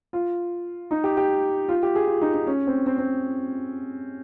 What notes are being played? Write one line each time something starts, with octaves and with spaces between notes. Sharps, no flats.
F4
D#4
G4
G4
F4
G4
G#4
F4
D#4
D#4
C#4
C4
C4
C4